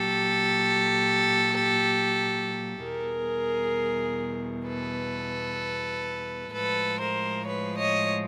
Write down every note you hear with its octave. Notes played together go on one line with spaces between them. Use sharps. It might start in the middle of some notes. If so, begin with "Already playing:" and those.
Already playing: A#2 F#3 G4 A4
E2 B2 G3 G#4 A#4
A4 B4
A2 F3 G#3 A4 B4
A#4 C5
B4 C#5
C#5 D#5